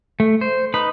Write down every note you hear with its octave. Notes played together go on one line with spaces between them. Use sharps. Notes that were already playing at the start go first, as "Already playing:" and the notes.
A3
C5
D#4 B4 B5